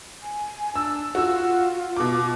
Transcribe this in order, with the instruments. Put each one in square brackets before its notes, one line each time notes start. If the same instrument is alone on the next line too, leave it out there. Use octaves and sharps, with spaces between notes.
[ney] G#5
[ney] D4 [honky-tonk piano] E6
[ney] F4 [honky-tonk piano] F#4 E6
[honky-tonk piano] B2 D6